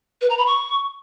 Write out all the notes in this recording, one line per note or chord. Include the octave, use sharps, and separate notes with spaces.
B4
A#5
B5
C#6